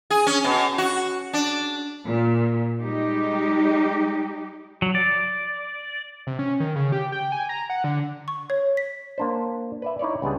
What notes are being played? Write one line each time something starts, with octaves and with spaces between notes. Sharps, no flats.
G#4
C#4
B2
F#4
D4
A#2
G3 G#3 D#4 G4
F#3
D5
C3
C#4
D#3
C#3
G4
G5
G#5
A#5
F#5
D3
C#6
C#5
B6
A#3 D4 C5
B4 D5 E5
D#4 E4 C#5 D5
C#2 G3 B3 D4 G#4